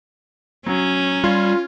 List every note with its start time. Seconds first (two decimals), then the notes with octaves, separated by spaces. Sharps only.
0.66 F#3 C#4
1.24 G3 F4 G#6